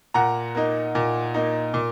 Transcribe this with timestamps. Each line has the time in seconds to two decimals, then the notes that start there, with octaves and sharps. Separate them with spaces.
0.14 A#2 F#5 A#5
0.55 A#3 D#4
0.95 A#2
1.34 A#3 D#4
1.74 A#2